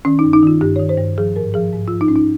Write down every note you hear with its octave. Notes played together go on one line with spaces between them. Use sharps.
D#3 C#4
D#4
G2
D#4
D#3 F4
G2 G4
D#3 C#5
C5
G2
F3 G#4
G#2 A#4
F3 G#4
G#2
F3 F4
D#4
G#2 C#4
D#4